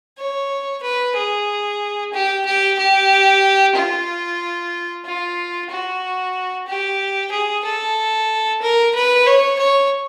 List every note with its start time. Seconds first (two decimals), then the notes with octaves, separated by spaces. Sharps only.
0.18 C#5
0.83 B4
1.16 G#4
2.13 G4
2.45 G4
2.78 G4
3.75 F4
5.05 F4
5.70 F#4
6.67 G4
7.32 G#4
7.65 A4
8.62 A#4
8.95 B4
9.27 C#5
9.59 C#5